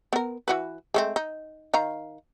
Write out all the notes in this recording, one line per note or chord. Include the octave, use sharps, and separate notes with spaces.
B3 A#4
E3 F#4 B4
G#3 A3 C4
D#4
D#3 F5 A#5